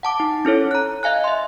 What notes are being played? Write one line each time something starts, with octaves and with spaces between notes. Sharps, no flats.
F#5 A5 D6
D#4
C#4 E4 A4 C#5
A#5 F#6
D#5 F5 G#5 F#6
E5 C6